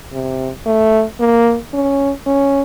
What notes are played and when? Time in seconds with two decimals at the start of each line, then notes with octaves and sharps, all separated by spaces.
0.13 C3
0.66 A3
1.20 A#3
1.74 C#4
2.27 C#4